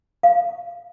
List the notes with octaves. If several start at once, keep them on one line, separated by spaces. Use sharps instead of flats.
F5